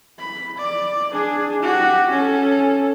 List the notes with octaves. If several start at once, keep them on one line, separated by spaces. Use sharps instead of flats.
B5
D5
D4 G#4
F#4 G4
C#4 A4